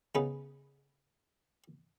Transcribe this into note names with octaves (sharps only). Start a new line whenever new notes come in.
C#3 B3 D#4 G#4 B4